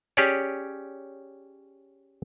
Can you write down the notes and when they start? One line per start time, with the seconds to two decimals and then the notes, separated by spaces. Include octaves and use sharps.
0.17 C#4 G4 G#4 C#5 D5